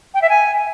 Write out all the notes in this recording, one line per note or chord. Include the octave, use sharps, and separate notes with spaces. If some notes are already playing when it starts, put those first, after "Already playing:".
G5
E5
G#5